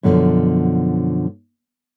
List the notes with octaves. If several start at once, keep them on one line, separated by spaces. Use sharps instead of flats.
F#2 B2 D3 D#3 F3